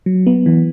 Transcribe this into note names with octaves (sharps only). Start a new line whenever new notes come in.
F#3
B3
E3